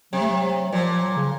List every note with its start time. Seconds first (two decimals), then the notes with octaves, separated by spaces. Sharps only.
0.13 C3 F#3
0.20 A3
0.29 F#3
0.73 A#2 F3
0.87 F3
1.02 F#3
1.17 C#3